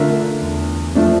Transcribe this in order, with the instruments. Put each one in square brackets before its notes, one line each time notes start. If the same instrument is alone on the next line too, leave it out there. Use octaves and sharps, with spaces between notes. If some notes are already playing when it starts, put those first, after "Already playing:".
Already playing: [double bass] D3 [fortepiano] A3 D4 F4 A#4 E5
[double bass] E2
[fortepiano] F3 A3 D4